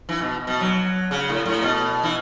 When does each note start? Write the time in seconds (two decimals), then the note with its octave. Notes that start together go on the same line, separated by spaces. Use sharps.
0.09 E3
0.21 B2
0.47 B2
0.61 F#3
1.11 C#3
1.29 A2
1.46 A2
1.62 B2
2.04 E3